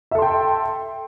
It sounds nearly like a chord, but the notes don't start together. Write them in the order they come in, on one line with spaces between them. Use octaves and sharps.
E5 A4 C6 G5